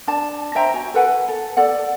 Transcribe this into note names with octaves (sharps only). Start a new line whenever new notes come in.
D4 A5
C5 E5 G5 A#5
F#4 G#5
A4 B4 F#5 G#5
A4
A4 D5 F#5